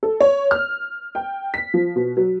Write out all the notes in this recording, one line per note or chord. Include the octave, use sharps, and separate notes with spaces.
A4
C#5
F6
G5
B6
F3
B2
F#3